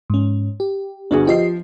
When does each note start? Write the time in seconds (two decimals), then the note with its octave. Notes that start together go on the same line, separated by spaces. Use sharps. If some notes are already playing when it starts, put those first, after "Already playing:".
0.10 G#2 C#4
0.60 G4
1.11 G1 D4 F#4 G#4
1.27 F3 G4 D#5 C7